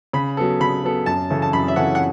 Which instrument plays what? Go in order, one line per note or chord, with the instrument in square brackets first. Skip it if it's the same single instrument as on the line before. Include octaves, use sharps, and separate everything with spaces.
[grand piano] C#3 [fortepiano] B5
[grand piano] F#3 B3 A4
[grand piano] C#3 [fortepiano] B5
[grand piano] F#3 B3 A4
[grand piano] F#2 [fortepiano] A5
[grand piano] C#3 E3 C#4 A4
[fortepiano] A5
[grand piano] F#2 [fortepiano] B5
[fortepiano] E5
[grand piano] C#3 E3 C#4 A4 [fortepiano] F#5
[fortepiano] F#5